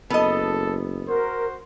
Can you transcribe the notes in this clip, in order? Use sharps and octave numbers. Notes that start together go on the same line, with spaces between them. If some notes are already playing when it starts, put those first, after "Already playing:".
F#1 B3 A4 D#5
F#4 A#4 C5